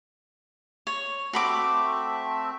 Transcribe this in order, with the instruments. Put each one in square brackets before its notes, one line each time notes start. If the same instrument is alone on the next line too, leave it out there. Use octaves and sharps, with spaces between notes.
[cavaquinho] C#5
[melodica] A3 C4 E5 [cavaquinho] F#4 B5 D6